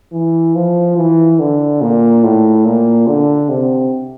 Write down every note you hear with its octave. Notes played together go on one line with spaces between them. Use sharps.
E3
F3
E3
D3
A#2
A2
A#2
D3
C3